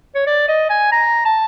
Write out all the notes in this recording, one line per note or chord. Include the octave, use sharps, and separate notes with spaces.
C#5
D5
D#5
G#5
A#5
A5